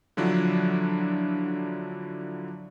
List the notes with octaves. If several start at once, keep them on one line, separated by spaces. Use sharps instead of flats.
D3 F3 F#3 D4 E4